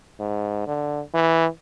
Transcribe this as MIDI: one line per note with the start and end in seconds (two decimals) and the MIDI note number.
0.19 0.65 44
0.67 1.00 50
1.14 1.46 52